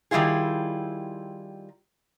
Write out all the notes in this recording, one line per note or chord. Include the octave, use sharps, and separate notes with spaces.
D#3 G3 E4 F4 G#4